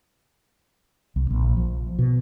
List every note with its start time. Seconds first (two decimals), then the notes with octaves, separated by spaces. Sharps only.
1.16 C2
1.30 A#1
1.57 F3
1.99 B2